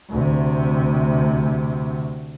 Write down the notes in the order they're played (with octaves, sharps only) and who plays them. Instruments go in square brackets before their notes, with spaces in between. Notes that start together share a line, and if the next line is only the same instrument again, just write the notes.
[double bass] D2 C3